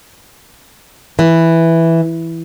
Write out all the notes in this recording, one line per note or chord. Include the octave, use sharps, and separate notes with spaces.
E3